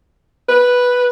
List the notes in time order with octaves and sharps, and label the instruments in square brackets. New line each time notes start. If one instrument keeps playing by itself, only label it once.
[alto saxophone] B4